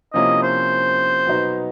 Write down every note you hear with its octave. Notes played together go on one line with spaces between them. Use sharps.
C3 F3 A#3 C#4 E4 D#5
C5
B2 F#3 B3 D#4